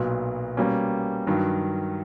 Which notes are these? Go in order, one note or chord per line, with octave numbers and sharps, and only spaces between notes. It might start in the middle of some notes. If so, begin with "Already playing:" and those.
Already playing: B1 A#2 F#3 B3
B2 G3 A#3 C#4
G2 D#3 F#3